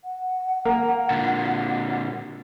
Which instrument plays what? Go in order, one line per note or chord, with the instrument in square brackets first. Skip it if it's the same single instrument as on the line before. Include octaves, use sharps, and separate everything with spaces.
[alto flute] F#5
[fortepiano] A#3
[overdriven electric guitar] A#2 D3